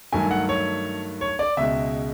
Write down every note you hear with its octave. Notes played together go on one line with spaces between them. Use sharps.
G2 D#3 F#3 A3 G#5
F#5
C#5
C#5
D5
C#2 B2 G#3 E5